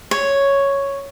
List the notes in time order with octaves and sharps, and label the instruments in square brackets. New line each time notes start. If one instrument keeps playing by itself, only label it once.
[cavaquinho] C#5